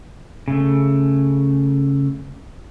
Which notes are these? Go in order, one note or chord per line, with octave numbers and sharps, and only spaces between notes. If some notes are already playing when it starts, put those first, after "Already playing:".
C#3 A3